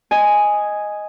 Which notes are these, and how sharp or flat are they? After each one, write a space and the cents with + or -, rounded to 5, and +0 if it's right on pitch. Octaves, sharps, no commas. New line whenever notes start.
D#5 +0 G#5 +0